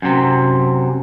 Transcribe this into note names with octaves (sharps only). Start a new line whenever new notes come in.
F#2 C3